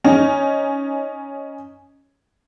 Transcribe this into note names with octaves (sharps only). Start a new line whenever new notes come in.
C#4 D#4